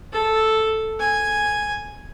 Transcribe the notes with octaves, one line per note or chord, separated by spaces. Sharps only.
A4
G#5